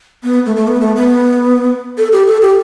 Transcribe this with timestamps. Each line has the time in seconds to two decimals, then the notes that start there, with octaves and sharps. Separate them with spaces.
0.23 B3
0.46 A3
0.56 A3
0.68 B3
0.81 A3
0.96 B3
1.98 A4
2.12 G4
2.27 A4
2.42 G4